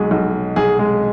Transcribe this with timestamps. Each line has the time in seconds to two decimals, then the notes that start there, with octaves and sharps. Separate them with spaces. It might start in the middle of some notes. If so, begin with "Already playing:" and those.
Already playing: B1 F#3 G#3 F#4 G#4
0.11 B1
0.56 B1 G#4
0.79 G#3 G#4